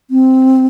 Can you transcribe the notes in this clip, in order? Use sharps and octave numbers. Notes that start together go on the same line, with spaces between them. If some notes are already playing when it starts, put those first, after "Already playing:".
C4